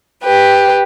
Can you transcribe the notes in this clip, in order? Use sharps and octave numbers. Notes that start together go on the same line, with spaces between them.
G4 B4